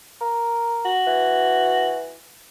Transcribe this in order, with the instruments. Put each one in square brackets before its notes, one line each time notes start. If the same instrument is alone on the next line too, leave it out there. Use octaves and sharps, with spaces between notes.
[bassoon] A#4
[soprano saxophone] F#4
[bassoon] E3